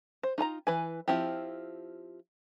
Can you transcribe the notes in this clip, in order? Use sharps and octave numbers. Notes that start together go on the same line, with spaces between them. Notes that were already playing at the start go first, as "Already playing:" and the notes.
C5
D#4 F4 A5 A#5
E3 B4 G#5
F3 C4 E4 F4 G4